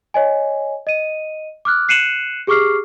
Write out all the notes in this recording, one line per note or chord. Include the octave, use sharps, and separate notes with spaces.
C#5 D#5 G#5
D#5 D#7
D6 F6 F#6
F#6 C7 C#7 D#7 E7 F#7
G4 G#4 C#6 D6 F6 C7